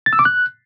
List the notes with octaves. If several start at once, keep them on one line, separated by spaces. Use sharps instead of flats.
A6
E6
D6
F#6